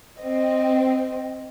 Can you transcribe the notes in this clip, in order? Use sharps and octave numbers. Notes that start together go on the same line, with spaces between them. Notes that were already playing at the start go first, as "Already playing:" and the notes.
C4 D#5